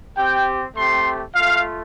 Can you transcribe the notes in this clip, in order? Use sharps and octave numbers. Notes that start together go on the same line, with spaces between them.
C4 G4 G5
A3 C4 G4 C6
A3 F4 F5